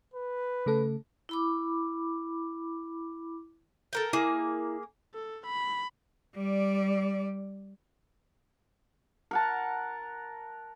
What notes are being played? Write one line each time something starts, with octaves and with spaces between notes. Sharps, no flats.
B4
C#3 A3 A4
E4 B5 D6
A4 A#4 G5
A#3 E4 G#4
A4
B5
G3 D5
A#4 F#5 A5